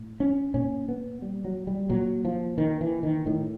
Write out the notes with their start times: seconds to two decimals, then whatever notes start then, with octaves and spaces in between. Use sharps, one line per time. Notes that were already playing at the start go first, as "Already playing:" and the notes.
Already playing: A2
0.20 C#4
0.54 A#2 C#4
0.88 B3
1.22 G3
1.45 F#3
1.67 G3
1.90 A#2 F#3
2.25 F3
2.58 D#3
2.81 E3
3.03 D#3
3.26 A2 D#3